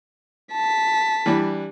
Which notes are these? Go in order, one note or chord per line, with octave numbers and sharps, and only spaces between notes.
A5 B6
E3 G3 D4